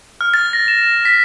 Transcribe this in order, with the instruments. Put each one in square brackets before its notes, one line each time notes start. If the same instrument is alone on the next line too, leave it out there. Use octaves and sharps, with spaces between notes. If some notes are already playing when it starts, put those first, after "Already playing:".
[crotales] F6
A6
A#6
E7
E7
B6